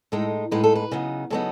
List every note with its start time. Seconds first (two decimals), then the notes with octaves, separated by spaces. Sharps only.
0.12 A2 G#3 D#4 A4
0.51 A2 G#3 D#4 B4
0.64 A4
0.75 B4
0.92 C#3 F#3 B3 D#4
1.30 C#3 F#3 B3 D#4 A4